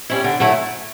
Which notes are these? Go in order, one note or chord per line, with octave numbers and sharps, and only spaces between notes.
G3 C#4 E4
D3
F#3 A3 E4